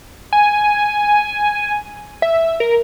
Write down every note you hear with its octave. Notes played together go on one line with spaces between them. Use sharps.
G#5
E5
A#4